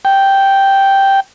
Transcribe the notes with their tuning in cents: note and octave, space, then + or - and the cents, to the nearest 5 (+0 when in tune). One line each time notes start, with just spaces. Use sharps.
G5 +0